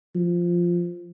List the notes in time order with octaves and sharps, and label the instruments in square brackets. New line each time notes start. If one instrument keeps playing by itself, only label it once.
[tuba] F3